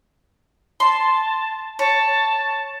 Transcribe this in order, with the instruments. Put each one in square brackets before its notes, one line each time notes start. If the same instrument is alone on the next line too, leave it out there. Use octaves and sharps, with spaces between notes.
[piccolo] A5 [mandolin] C6
[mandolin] C#5 [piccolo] A5